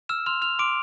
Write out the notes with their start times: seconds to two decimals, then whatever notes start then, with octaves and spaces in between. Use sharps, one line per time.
0.09 E6 F6 E7
0.26 C6 F6 F7
0.42 F6 F7
0.59 C6 D6 D7